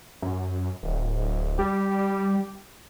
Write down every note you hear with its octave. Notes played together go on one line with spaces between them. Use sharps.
F#2
D1
G3 G4